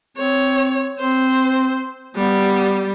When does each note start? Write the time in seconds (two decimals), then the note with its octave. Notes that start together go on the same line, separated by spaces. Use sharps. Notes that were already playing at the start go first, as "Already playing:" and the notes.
0.17 C4 C#5
0.99 C4 C5
2.16 G3 B3